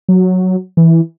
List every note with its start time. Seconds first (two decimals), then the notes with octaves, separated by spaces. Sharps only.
0.09 F#3
0.77 E3